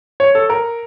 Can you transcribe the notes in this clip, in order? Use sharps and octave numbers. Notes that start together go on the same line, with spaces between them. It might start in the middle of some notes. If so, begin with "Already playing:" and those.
C#5
A4
A#4